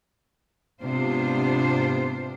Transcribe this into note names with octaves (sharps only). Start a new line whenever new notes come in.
G#2 C3 B3 D4 F4 C5